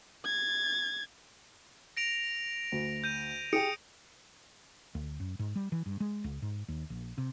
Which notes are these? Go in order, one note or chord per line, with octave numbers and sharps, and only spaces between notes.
G#6 A6
A#6 D7 F7
D2
G6 D#7
G4 G#4 G5 D#6 C#7 D7
D2
F#2
G#2
G3
E3
G2
G#3
C#2
G#2
D#2
A#1
C3